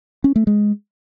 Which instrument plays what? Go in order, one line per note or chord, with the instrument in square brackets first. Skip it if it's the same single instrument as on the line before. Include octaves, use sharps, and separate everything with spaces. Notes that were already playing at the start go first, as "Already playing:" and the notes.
[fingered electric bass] C#4
A3
G#3